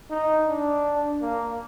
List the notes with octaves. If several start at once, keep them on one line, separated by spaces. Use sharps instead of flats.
D#4
D4
A#3